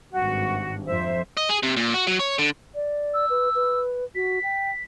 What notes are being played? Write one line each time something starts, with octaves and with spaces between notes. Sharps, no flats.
G#1 G2 F#4
F2 C5 E5
D#5
G#4
C3
A#2
F#4
F#3
C#5
D3
D5
E6
B4
B4
F#4 B6
G5